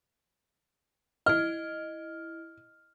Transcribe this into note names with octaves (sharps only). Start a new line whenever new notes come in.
E4 D#5 F6